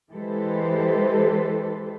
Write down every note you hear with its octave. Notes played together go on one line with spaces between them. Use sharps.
E3 G#3 G4 A4 B4 C5